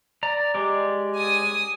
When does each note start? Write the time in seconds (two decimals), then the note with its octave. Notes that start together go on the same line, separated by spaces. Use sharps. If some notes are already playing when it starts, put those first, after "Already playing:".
0.23 D5 A#5
0.54 G#3 G4 D5
1.16 G#5 D#6